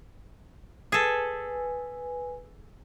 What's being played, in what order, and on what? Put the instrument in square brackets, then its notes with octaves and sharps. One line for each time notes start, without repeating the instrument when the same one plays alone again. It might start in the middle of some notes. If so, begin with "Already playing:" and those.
[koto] G#4 A4 [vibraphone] B4 G#5